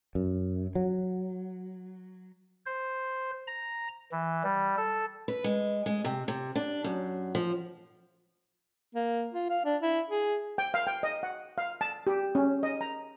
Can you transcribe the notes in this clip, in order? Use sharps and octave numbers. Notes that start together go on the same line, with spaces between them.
F#2
F#3
C5
A#5
E3
G3
A4
B4
G#3
G#3
C3
C3
D4
F#2
F3
A#3
F4
F5
D4
E4
G#4
G5
F5
G5
D#5
F#5
F5
A5
G4
C#4
D#5
A#5